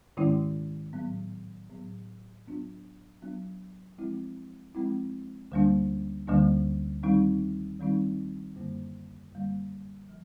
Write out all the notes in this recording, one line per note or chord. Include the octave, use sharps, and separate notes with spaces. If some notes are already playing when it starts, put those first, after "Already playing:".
G#2 D#3 G#3 C#4 E4
A2 F#3 B3
A2 F#3 B3
F#3 B3 D4 F4
F#3 B3 D4 F4
F3 G#3 C4 E4
F3 G#3 C4 E4
D2 D3 G3 A#3 D4
D2 D3 G3 A#3 D4
D#3 G3 C4 D#4
D#3 G3 C4 D#4
F#2 D3 G3 A#3
F#2 D3 G3 A#3
F3